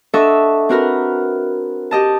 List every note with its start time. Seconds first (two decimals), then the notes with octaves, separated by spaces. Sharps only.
0.14 D4 A4 D#5 E5 F#5 C#6
0.69 C4 F#4 A#4 B4
1.91 G4 D#5 A5